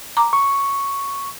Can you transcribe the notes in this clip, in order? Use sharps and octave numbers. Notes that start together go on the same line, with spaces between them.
A#5 D6
C#6